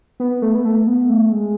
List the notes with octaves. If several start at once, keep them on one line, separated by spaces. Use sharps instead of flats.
B3
A3
B3
A3
B3
A3
G#3